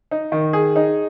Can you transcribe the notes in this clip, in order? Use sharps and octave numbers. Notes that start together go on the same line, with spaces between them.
D#4
D#3
G#4
D#4